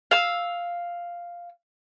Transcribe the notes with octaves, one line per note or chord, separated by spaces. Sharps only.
F5 E6